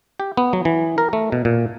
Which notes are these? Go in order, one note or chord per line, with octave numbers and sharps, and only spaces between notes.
G4
B3
F#3
E3
A#4
A3
B2
A#2